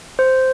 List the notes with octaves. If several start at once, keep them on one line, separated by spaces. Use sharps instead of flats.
C5